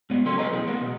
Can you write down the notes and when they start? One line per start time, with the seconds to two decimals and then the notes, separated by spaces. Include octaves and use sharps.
0.10 G#2 B3
0.25 C#3 F#3 A4 C6
0.38 A4 B4 C#5 D#5 A#5
0.51 B1 E2 G#4
0.67 A#3 B3
0.81 B2